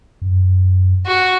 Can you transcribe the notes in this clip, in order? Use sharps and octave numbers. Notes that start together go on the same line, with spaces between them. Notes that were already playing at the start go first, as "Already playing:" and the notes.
F#2
F#4